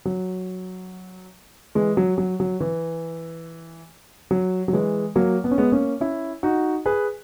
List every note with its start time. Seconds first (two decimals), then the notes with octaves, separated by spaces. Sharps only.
0.05 F#3
1.75 E3 G#3
1.97 F#3
2.18 F#3
2.40 F#3
2.60 E3
4.31 F#3
4.68 F#3
4.73 E3 G#3
5.15 F#3 A#3
5.44 B3
5.51 C#4
5.58 G#3 B3
5.72 A#3 C#4
6.01 C#4 E4
6.43 D#4 F#4
6.86 G#4 B4